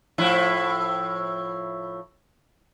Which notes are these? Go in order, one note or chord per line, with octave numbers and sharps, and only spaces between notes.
A2 F3 E4